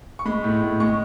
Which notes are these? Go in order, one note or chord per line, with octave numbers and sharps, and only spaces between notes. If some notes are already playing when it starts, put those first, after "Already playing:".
C#6
G#3 B5
A2
A2
G#3 C#6